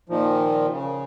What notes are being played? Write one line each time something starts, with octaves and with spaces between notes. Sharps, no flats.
A#2 D#3 F3
C#3